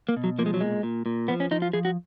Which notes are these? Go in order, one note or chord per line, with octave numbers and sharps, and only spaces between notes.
A#3
B2
F#3
F3 A#3
G#3
F#3
A#2 G#3
A#2
A#2
F3 B3
C#4
F3 D#4
F4
F3 G#4
F#4